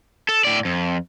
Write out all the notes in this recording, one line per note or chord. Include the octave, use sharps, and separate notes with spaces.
A4
A2 D5
F2